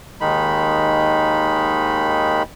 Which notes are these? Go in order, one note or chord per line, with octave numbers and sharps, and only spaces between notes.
D#2 D#3 G#3 D#4 B5